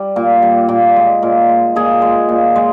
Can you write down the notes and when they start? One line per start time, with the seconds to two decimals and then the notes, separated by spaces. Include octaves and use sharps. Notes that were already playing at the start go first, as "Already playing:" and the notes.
Already playing: G3
0.16 A#2
0.42 G3
0.69 A#2
0.96 G#3
1.23 A#2
1.49 G#3
1.76 A#2 G#4
2.02 G#3
2.29 A#2
2.56 G#3